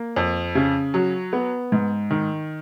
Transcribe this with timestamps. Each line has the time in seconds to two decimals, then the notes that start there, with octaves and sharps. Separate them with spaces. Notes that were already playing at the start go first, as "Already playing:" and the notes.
Already playing: A#3
0.16 F2
0.55 C#3
0.94 F#3
1.33 B3
1.72 G#2
2.11 D#3